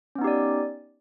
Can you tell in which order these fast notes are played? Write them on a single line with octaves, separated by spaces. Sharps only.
C#4 B3 D#4 G4 D5